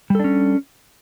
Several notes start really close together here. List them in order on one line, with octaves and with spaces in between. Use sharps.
G3 A4 D4 C#4